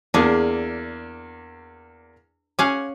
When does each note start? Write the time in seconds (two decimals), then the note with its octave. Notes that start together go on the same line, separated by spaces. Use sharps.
0.14 E2 A#3 D4 G#4
2.59 C#4 F5 F#5 G#5 D6